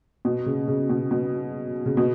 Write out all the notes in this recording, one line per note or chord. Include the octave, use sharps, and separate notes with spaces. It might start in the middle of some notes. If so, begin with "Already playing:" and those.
B2
C#3
C#3
B2
B2
C#3
B2